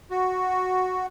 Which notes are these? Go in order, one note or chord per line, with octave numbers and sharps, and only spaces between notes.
F#4